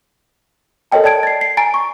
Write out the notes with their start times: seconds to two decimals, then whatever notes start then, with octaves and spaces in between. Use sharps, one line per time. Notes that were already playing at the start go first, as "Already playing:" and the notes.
0.92 A4 A#4 C#5 D#5 G5 A5
1.04 D5 G5 A5 G#6 D7
1.23 A6 C7
1.41 C7
1.57 G#5 A#5 A6 D7
1.74 C#6